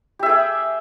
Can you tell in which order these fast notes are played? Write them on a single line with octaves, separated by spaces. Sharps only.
G4 E5 G#4 G5